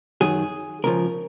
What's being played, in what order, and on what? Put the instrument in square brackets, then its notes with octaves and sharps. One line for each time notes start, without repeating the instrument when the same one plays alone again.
[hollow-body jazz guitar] F#2 D#3 F#3 G#4
C#2 C#3 F3 A#4